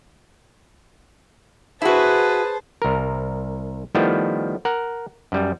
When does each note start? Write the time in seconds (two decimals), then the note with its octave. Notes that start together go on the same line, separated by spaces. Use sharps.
1.82 E4 F#4 G#4 B4 C5 A5
2.82 C2 A#4
3.95 D#3 F3 G3 A3 B3 E4
4.65 A#4 F#5
5.32 F#2 G3